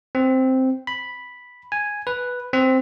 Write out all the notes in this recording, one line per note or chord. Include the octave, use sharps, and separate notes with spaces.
C4
B5
G#5
B4
C4